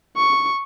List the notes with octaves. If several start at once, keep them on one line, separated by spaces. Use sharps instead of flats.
C#6